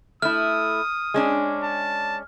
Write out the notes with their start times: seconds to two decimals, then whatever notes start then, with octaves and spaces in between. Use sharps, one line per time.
0.22 A3 E4 D#6 F6
1.14 G#3 C#4 D4
1.63 A5